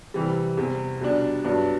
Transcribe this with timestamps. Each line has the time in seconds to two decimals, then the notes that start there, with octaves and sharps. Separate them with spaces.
0.14 C3 E3 G3
0.57 E2 C3 G3
1.01 B2 G3 D4
1.44 G2 F#3 B3 D4